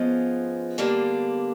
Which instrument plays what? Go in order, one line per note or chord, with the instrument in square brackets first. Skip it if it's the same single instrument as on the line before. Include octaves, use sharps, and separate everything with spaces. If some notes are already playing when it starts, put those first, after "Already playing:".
Already playing: [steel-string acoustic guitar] F3 G#3 C#4 [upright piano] B3
[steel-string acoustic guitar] D3 G3 A#3 D4